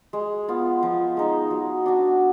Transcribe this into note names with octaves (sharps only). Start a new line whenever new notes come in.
G#3
B3 F4
F3
G#3 D#4
F#3
D4 F#4